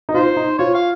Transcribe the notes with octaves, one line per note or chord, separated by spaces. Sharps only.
D#4
F4 C5
D#4
F4 C#5
F5